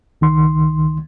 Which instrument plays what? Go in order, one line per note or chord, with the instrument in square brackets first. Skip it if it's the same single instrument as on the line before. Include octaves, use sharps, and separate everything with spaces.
[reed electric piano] C#2 D#3 C6